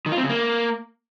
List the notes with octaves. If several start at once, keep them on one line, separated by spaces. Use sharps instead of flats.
D#3
F4
C4
C#3
A#3